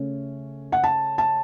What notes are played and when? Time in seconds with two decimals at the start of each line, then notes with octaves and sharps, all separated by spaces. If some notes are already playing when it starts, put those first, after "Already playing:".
Already playing: C#3 A3 C#4
0.72 F#5
0.84 A5
1.18 A5